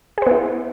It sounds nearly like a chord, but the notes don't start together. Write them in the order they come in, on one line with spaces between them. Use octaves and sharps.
G#4 C5 B3 E4